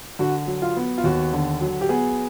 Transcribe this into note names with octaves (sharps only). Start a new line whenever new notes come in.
D3 F#4
F#3
F4
B3
F4
D#2 F#4
D3
F#3
G4
B3 G#4